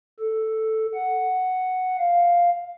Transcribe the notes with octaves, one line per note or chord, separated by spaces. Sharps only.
A4
F#5
F5